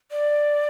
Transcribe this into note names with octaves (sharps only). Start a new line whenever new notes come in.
D5